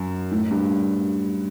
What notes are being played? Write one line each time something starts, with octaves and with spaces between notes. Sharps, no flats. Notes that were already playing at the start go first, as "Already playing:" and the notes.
Already playing: F#2
A2
G2